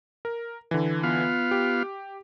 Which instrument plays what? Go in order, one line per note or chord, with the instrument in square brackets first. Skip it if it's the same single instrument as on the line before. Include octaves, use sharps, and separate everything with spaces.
[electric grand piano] A#4
D3 E3
[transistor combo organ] B3 F4 F5
[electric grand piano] G4